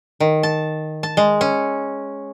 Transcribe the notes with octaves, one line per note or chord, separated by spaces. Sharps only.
D#3
A5
A5
G#3
C#4